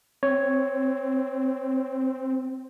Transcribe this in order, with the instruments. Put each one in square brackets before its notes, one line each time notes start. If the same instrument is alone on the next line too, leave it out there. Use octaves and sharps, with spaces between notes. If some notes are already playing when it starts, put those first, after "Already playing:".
[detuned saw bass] C4 [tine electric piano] C#5